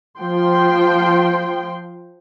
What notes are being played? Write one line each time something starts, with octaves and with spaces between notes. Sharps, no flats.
F3 G5 C6